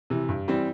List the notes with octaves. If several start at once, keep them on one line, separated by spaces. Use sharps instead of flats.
C3 E3
G2
E3 G3 C4